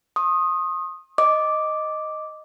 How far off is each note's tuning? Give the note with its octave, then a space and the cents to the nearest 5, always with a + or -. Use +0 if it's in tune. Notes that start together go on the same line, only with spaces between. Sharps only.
C6 +45 D#6 +0
D#5 +0 D6 +0